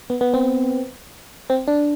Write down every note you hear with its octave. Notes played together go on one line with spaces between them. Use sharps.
B3
B3
C4
C4
D4